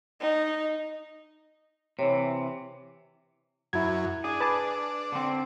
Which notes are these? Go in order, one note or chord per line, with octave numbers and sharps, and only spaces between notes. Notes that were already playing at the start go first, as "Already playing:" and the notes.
D#4
C3 E3 C#5
F#2 E4 G#6
D4 G#4
B4 A5 D6
D3 C4